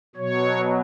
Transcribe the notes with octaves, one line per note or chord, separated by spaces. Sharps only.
B2 F#3 C#5